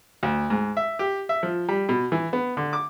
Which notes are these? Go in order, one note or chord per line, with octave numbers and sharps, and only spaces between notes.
D2
G#2
E5
G4
E5
F3
G3
B2
E3
B3
D3
D6